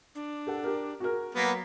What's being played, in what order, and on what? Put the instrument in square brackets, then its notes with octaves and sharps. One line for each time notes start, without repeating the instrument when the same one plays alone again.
[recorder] D4
[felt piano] G4 A4 F#5
G4 A#4
F#4 G#4 A#4
[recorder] F#3 [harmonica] A#3 B3